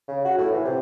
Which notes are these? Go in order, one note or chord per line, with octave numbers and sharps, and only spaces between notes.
C#3
F#4
A2
E3
C3